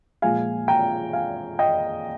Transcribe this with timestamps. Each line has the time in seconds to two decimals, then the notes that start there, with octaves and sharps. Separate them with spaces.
0.22 A#2 F3 G#3 F5 G#5
0.68 G5 A#5
1.13 F5 G#5
1.59 D#5 G5